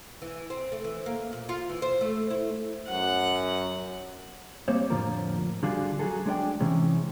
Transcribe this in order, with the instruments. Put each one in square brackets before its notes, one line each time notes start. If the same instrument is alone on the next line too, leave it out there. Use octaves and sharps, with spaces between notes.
[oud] E3
C4
A3
E3
A#3
A#2
F4
E3
C5
A3
E4
[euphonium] F#2 [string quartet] F#5
[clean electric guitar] G3 A#3 C4 C5 C#5
F2 A2 D3 F3 F4 A#4
D3 G3 F4 F#4 G#4
F#3 F#4 G#4 A4
G#3 D4 D5 G5
C3 E3 G#3 C#4